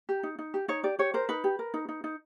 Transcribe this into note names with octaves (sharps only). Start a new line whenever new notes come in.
G4
D#4
D#4
G4
D#4 C#5
G4 D5
G4 C#5
A#4 C5
D#4 B4
G4
A#4
D#4
D#4
D#4